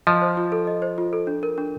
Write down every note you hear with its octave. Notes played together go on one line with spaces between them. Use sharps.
F3 D#5
C5
F4
A4
D#5
C5
F4
A4
D4
A#4
D4